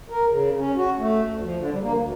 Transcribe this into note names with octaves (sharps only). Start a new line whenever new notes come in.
A#4
C#3
C#4
F#4
A3
D2
F3
D3
G3
A#3
D2